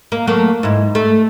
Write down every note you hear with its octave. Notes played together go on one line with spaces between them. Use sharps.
A#3
F#3 A3 A#3
G#2 E4
A3